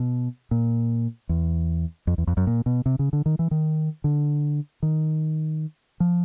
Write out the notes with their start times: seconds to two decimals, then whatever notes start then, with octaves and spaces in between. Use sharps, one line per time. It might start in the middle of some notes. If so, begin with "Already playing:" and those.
Already playing: B2
0.51 A#2
1.29 E2
2.07 F2
2.18 E2
2.27 F2
2.37 F#2
2.47 A#2
2.66 B2
2.86 C3
2.99 C#3
3.13 D3
3.26 D#3
3.39 E3
3.51 D#3
4.04 D3
4.83 D#3
6.00 F3